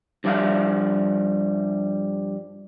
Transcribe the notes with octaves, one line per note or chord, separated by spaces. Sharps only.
G2 F3 G3 G4 E5 F5